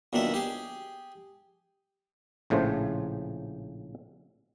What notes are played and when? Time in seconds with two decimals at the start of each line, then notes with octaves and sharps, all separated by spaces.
0.13 B1 A#2 D#3 D4 E5
0.34 G4 G#4
2.50 A#1 A2 C#3 A3 C5